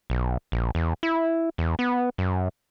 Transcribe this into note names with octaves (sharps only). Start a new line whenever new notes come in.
B1
A#1
E2
E4
E2
B3
F#2